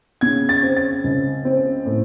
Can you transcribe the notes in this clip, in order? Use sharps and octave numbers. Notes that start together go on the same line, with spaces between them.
C#3 G#6
A6
C4
A6
C#2
C4
A2